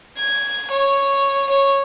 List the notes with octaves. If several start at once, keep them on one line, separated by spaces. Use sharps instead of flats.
G#6
C#5
C#5